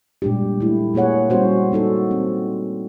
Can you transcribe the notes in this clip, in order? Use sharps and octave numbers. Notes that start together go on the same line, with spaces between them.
A#2 G3 G#3 D4 G4
A3 E4
A#2 A#3 G#4 C#5 F#5
G3 B3 C#4 F#4 C5
A#3 D#4 F#4 A4
C4